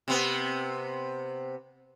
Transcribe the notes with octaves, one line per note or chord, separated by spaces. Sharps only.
C3 B3